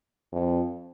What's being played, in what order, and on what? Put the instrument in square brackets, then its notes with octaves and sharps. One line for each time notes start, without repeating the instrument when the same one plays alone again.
[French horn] F2